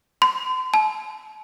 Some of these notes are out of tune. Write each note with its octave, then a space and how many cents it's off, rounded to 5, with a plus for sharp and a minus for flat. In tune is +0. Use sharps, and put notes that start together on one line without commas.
C6 -40
A5 -35